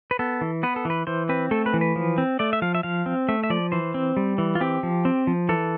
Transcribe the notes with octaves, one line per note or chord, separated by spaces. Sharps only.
B4
B3 A4
E3
B3 B4
A4
E3 B4
E3 C5
C4 B4
A3 A4
B4
E3
B4
F3
C4
A3 D5
E5
F3 F5
E5
F3 F5
C4
A3 E5
E5
F3 D5
E3 C5
C4
G3
E3
F4
C4 G4
F3
C4
F3
E3 A4